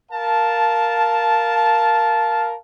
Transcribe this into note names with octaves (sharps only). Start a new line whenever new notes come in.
A#4 F5 A5